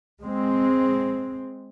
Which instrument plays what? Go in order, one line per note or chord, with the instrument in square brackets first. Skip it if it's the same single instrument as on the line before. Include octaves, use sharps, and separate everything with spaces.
[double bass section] G#3 C4